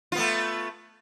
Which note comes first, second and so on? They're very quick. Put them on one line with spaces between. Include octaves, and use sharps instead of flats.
F4 B3 A3